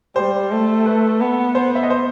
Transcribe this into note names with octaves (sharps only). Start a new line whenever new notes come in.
G3 C5
A3
B4
B3
C5
E5
D#5
C5